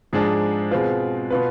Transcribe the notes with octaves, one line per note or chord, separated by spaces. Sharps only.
G#2 F3 G#3 D4 G#4
B2 G#3 C4 F4 B4
B2 B3 F4 B4